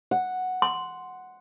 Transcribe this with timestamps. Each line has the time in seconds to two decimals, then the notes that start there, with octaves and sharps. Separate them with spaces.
0.11 F#5
0.62 C6